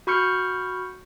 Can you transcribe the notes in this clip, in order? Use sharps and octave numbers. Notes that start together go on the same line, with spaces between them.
F#4 B5 C#6 F6 G6 C#7